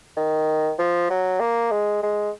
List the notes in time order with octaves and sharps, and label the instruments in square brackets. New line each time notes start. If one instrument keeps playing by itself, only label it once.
[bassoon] D#3
F3
F#3
A#3
G#3
G#3